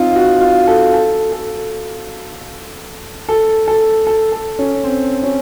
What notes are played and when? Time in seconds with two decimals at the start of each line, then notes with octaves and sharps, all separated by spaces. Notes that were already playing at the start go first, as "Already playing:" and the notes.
Already playing: C4 D#4 F4
0.16 F#4
0.41 F4
0.67 A4
0.94 A4
1.32 A4
3.29 A4
3.68 A4
4.07 A4
4.32 A4
4.59 C#4
4.84 C4
5.23 C#4